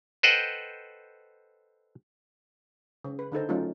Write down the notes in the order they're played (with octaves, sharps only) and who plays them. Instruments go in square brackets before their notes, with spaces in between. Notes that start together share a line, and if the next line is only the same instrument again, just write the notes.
[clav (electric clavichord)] A4 B4 C5 D#5 F#5 G5
[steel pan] C#3
B4
D3 D#4 A4 C5
F#3 A3 C#4 D#4 F4